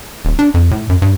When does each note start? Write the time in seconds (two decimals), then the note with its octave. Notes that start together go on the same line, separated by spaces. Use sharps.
0.25 D#1
0.39 D4
0.54 F2
0.71 A2
0.89 F#2
1.02 G2